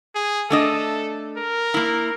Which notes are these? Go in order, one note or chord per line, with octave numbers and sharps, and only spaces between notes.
G#4
A3 D4 A4 D#5
A#4
A#3 E4